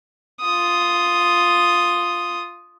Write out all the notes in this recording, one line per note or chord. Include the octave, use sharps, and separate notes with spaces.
F4 D#6